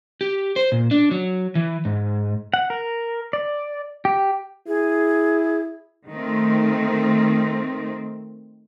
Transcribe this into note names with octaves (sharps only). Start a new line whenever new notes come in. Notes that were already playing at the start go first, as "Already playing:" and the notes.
G4
C5
A#2
D4
F#3
E3
G#2
F#5
A#4
D5
G4
E4 G#4
D#3 A3 C4